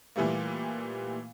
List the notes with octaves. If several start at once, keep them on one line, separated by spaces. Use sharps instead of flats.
A#2 E3 G3 A3 A#3